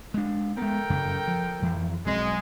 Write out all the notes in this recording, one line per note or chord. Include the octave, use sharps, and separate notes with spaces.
G#3 D4
G#3 B3 A4 A#4 G5
F#2 C#3
F3
F2 E3 F3
B1 F#3 G#3 C4